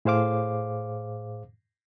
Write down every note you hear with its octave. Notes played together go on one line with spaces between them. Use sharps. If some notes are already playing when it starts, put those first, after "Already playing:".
A2 G#4 C5 F5 D6